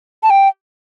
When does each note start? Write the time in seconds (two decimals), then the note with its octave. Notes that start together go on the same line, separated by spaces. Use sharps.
0.23 A5
0.30 G5